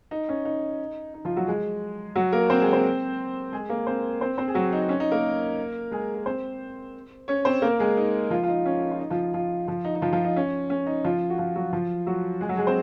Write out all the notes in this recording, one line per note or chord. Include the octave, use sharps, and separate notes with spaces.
D#4
C#4
D#4
D#4
F3 F4
F#3 F#4
G#3 G#4
F#3 F#4
A#3 A#4
C4 C5
G#3 G#4
C4 C5
G#3 G#4
A#3 A#4
C4 C5
C4 C5
C4 C5
G#4
F#3 F#4
D#4
C#4
D#4
A#3 A#4
G#3 G#4
A#4
C4 C5
C#4 C#5
C4 C5
A#3 A#4
G#3 G#4
D#4
F3 F4
F4
D#4
C#4
D#4
F4
D#4
F3 F4
F3 F4
F3 F4
D#4
D#4
F3 F4
F3 F4
D#4
C#4
C#4
D#4
F3 F4
F#4
F3 F4
F#3 F#4
F3 F4
F#3 F#4
G#3 G#4
F#3 F#4
G#3 G#4
C4 C5